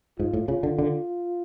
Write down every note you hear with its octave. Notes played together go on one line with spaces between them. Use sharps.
G#2 F4
A2
C#3 F4
D3
D3